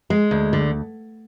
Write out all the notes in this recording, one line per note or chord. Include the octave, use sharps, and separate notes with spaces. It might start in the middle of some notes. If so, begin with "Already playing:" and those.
G#3
D2
D3